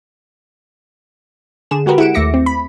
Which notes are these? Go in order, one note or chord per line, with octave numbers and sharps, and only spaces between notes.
D3 G#4 E7
G#3 F#4 G4 A#4 B4
E4 G#4 F#5 C#7 D7 E7
D#2 A3 E5 D6 A#6 C#7
C4
B5